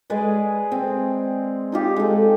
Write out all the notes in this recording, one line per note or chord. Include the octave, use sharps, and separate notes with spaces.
G#3 G#4 B4 D5
C4
D#4 F4 G4
G#3 A4